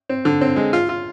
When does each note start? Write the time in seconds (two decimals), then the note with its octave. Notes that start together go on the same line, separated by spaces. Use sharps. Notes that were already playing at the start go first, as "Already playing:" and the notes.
0.09 C4
0.25 D3
0.41 C4
0.56 G#3
0.73 F4
0.89 F4